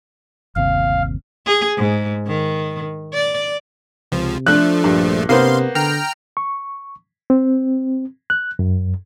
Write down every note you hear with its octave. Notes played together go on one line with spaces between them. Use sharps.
G1 D#2 C3 F5
G#4
G#2
D#3
D5
C#2 C3 F3
F3 A3 D4 F#6
A#1 G2
C3 A#3 B3 C5 F5 C6
D3 G5 A#5 F6
C#6
C4
F#6
F#2